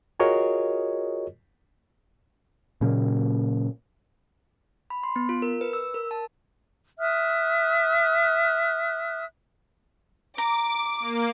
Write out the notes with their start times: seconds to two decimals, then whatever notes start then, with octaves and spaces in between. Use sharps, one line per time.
0.19 F4 F#4 G#4 A#4 C#5 D#5
2.81 A#2 C#3 F#3 A#3
4.90 B5
5.03 C6
5.16 B3
5.29 F4
5.42 A#4
5.61 B4
5.73 E6
5.94 A#4
6.11 A5
6.99 E5 D#6 F6 F#6
10.38 A#5 D6
11.00 A#3